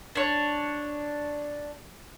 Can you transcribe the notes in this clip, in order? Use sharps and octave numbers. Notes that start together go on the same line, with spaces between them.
D4 C#5